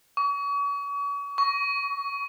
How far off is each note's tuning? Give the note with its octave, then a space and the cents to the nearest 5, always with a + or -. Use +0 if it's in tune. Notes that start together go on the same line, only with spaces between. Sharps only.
C#6 +40
C#6 +20